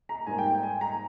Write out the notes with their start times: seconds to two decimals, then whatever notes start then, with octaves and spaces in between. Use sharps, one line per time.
0.09 A#5
0.26 G#2 G3 A#3 G#5
0.38 G5
0.50 G5
0.63 G#5
0.81 A#5